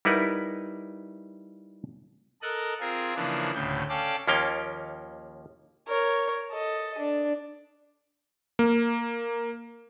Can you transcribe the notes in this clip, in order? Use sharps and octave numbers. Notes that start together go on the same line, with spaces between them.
G3 D#4 E4 A#4 B4 F#5
A4 A#4 D#5 F#6
C4 F4 G#4 A#4
C#3 E3 F3 A#3 D4
D2 A2 C#3 G6
C#4 A4 D5 F5 G5 A5
D#2 F3 A#3 C#4 F5 G5
A#4 C#5
A4 D#5
D4
A#3